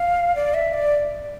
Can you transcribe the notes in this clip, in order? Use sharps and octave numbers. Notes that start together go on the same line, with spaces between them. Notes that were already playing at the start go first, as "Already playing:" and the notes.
Already playing: F5
D5
E5
D5